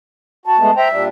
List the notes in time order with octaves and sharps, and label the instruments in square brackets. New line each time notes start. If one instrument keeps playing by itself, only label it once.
[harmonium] F#4 [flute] A5
[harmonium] G#3 A3 B3
[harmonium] C5 G5 A#5 [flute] E5
[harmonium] A#2 G3 D4